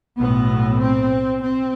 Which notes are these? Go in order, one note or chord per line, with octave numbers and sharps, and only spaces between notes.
B1 A2 B3
C4
C4